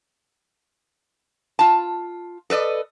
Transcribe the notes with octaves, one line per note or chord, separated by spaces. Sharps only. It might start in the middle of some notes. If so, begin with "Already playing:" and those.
F4 A5
A4 B4 D5 D#5